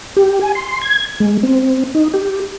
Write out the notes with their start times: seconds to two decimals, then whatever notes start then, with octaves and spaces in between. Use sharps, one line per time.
0.17 G4
0.41 G#5
0.55 C6
0.82 G#6
1.20 G#3
1.43 C4
1.94 D#4
2.14 G4